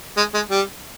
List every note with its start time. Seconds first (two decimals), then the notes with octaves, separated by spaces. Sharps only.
0.17 G#3
0.34 G#3
0.50 G3